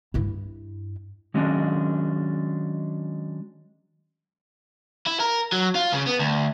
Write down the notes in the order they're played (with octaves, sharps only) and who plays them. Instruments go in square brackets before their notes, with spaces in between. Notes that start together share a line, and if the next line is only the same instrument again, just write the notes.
[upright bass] G2 E4
[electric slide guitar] D#3 F#3 G#3 C#4 D4
[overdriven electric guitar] E4
A#4
F#3
F4
C#3
B3
D2